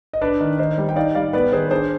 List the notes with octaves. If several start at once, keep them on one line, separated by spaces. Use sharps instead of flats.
D#5
D4 B4 D5
D#3
D#3 C5 D#5
G3
G5
D#4 D5 F5
G3 D5 F5
B3 B4 D5
D#3 G#4 C5
B4
D4 G#4 C5